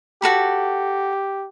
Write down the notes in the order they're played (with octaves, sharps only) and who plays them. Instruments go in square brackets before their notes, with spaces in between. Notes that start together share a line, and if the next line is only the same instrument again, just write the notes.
[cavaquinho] F#4 A4 B5 [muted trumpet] G4